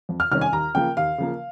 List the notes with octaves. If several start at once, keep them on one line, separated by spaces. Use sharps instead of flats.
F2
F6
C3 D#3 G3 C#4 F6
G#5
D#2 A#5
C#3 F3 A#3 G5
D#2 F5
C#3 F3 A#3